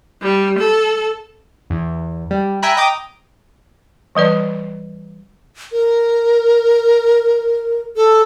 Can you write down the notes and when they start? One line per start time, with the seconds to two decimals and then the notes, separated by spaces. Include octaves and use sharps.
0.22 G3
0.58 A4
1.70 E2
2.31 G3
2.62 E5 G5 G#5 A#5 B5 F#6
2.77 D#5 G5 A#5 D6 D#6
4.15 E3 G3 B4 D5
5.72 A#4
7.96 A4